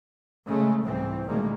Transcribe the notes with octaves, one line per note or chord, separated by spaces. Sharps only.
C#3 G#3 A3
C2 G#2 E3 C4
D2 A#2 D#3 G3 G#3 A#3